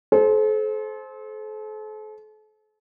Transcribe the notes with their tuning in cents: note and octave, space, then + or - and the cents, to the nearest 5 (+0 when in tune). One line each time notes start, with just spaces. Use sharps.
A4 -40 C5 +5